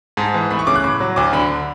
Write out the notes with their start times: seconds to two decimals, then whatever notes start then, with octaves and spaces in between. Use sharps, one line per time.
0.17 G#2 A5
0.34 E3
0.51 A3 B5
0.59 C#6
0.67 C#3 D6
0.76 F#6
0.84 A2 D6
1.00 F#3
1.16 D2 D6
1.33 D3 B5